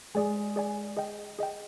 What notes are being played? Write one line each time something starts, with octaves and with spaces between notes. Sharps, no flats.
G#3 G#4 D5 G#5
G#4 D5 G#5
G#4 D#5 G5
G#4 D#5 G5